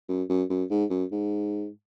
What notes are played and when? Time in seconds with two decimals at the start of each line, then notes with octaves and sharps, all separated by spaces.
0.09 F#2
0.29 F#2
0.50 F#2
0.70 G#2
0.90 F#2
1.11 G#2